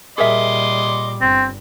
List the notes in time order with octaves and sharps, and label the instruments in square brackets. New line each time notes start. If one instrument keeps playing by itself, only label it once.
[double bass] A#2 G3 [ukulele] G#4 A#4 E5 [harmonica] D#5 C6 D6
[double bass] G1 [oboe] C4